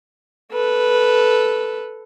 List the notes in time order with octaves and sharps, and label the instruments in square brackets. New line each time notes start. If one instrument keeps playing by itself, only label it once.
[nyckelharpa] A4 B4